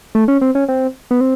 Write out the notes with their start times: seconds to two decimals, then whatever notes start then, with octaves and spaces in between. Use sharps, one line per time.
0.15 A3
0.28 C#4
0.41 C4
0.55 C#4
0.68 C4
1.11 B3
1.21 C4